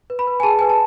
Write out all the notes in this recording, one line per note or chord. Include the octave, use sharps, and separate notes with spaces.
B4
B5
B4
G#5
G#4 A5
B4 G#5
A5